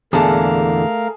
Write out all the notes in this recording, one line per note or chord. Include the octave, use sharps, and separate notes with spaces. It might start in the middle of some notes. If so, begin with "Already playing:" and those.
E2 A#2 D3 A3 G#4 A#4 F5 A5